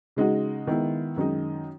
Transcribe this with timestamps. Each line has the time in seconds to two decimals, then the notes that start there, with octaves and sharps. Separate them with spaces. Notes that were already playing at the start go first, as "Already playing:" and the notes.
0.16 C#3 G#3 D#4 F#4
0.67 D#3 G#3 B3 E4
1.16 F#2 D#3 G#3 D#4